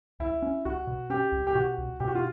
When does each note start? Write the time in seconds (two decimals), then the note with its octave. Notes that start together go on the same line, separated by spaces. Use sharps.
0.20 C#2 E4
0.42 C#4
0.65 C#2 F#4
0.87 B2
1.10 C#4 G4
1.32 C#2
1.47 G4
1.55 B2 F#4
1.78 C#2
2.00 B2 G4
2.08 F#4
2.15 F4